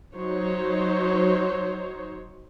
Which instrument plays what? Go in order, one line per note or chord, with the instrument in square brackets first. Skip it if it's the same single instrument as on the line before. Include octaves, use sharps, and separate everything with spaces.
[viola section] F#3 D#4 C5 C#5